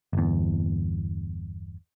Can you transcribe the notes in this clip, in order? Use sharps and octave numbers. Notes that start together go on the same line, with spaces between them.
G1 E2